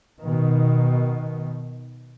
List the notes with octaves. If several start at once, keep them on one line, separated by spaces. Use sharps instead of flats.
B2 D#3